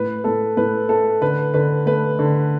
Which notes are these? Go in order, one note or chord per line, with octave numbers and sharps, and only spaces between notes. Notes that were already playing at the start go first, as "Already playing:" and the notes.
Already playing: A2 B4
A2 A4
A2 B4
A3 A4
D3 B4
D3 B4
A3 B4
D3